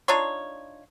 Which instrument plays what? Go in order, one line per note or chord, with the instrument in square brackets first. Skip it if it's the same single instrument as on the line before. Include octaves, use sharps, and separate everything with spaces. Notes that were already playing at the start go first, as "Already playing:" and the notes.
[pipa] D4 D#4 F4 C#5